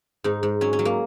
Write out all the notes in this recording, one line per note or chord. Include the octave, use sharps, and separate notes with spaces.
G#2 D#4
G#2
F#3 C#4
C#4
F#3
A#3